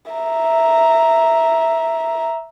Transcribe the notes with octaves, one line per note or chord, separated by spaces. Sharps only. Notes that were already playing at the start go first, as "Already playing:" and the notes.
E5 A#5